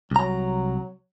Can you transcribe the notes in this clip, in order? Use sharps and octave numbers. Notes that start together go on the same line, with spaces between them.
C2 F#3 A#5